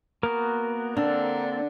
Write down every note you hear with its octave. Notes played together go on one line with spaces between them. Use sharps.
A#3 B3 F#4 A#4
D3 A#3 C4 D4 A4